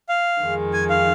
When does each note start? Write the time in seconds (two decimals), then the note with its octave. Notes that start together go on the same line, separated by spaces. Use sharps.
0.09 F5
0.41 F2 D#3 G#3
0.73 G#5
0.90 F5